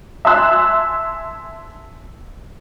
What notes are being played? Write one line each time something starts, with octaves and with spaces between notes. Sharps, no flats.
E5 G#5 A5 C6 E6 F#6